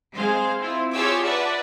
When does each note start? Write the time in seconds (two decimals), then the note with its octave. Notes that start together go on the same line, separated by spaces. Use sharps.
0.15 G#3 C4 G#4 C5 F5
0.58 C4 E4 F4
0.94 F4 G4 G#4 C#5 D6 E6
1.22 B4 D5 E5 F#5 A5